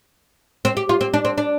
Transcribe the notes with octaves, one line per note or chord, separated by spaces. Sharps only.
C4
G4
F4
C4
D4
C4
D4